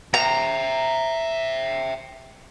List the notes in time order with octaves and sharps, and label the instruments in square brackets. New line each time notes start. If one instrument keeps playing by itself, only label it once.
[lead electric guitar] E5 G5 [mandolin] A#5